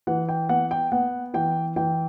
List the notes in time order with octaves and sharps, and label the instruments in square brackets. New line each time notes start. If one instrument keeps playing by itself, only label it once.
[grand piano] E3 F#5
G5
B3 F#5
G5
B3 F#5
E3 G5
E3 G5